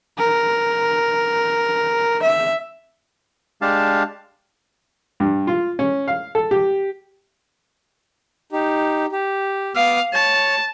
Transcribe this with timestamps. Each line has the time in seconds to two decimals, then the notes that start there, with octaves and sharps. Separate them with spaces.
0.18 A#4
2.23 E5
3.62 G#3 D4 G4 F5 A5
5.20 G2
5.47 F4
5.79 C#4
6.08 F5
6.35 A4
6.51 G4
8.52 D#4 G4
9.12 G4
9.75 B3 F5 D6 D#6
10.14 C#5 A5